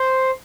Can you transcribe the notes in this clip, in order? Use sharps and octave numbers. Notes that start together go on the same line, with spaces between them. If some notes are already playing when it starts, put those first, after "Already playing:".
Already playing: C5